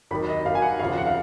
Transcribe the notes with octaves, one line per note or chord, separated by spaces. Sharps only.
D#2 D#3 F#3 B5
D#5
D#2 D#3 F#3 F5
G#5
F#5
D#2 C#3 F3 F5
F#5
F5